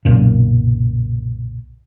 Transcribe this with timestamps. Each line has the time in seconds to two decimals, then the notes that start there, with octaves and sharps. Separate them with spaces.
0.05 B1 F#2 A#2 C#3